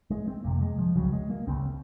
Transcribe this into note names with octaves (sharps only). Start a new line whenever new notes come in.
G#3
C4
F2 C3 A#3
G#3
F3
C#2 C#3 F#3
G#3
A#3
C#2 C#3 C4